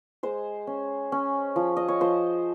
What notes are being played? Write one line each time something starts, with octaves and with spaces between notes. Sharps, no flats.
G#3 C5
C#4
C#4
F3
D#5
C#5
F3 C5